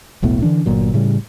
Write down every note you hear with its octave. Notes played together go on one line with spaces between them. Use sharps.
E1 B1 A2 B3
D3 E3 D4
G1 A#2 F#3
A2 C#3 G3